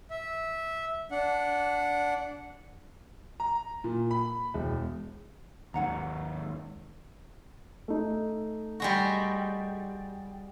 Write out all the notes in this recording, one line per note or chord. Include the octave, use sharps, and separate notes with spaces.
E5
D4 F#5
A#5
A#2
B5
E1
D#2 G#2 C#4 F#5 A#5
A3 D#4
G3 G#3 F#4